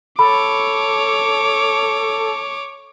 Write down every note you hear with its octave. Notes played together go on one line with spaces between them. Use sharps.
A4 C#5 B5 D6